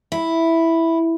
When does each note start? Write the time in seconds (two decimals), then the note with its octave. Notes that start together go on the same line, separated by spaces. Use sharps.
0.12 E4